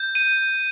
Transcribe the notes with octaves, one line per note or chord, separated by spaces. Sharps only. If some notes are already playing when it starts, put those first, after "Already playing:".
Already playing: G6
D#7